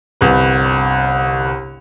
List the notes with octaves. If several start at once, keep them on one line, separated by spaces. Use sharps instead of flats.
G1 C2 B4